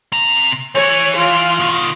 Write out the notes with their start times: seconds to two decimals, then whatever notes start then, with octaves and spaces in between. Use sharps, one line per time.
0.12 C3 A#5
0.75 E3 C#5
1.17 F4
1.60 B2 D#3